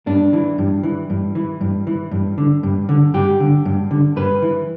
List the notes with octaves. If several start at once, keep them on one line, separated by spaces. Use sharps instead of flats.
G2 D4
E3
G2
E3
G2
E3
G2
E3
G2
D3
G2
D3
G2 G4
D3
G2
D3
G2 B4
E3